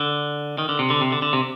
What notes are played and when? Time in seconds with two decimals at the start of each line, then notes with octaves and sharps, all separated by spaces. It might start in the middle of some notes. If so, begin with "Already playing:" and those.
Already playing: D3
0.58 D#3
0.69 D3
0.79 C3
0.90 D3
1.01 C3
1.12 D3
1.22 D3
1.33 C3